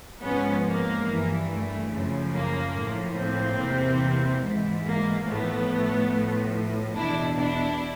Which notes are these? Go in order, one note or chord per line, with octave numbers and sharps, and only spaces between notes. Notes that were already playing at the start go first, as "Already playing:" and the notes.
G#2 F3 B3 C#4
A#3
G2 E3
A3
F#2 C#3 F3
A#3
A2 F3
A#3 C4
E2 C3 E3
G#2 E3
A#3
A2 F3 A3 B3
A2 F3
E2 B2 D4 E4
D4 E4